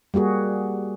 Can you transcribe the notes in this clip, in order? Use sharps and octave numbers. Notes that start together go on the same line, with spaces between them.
G3 A#3 F#4 G#4